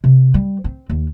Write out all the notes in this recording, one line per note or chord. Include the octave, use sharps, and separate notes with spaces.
C3
G3
C4
D#2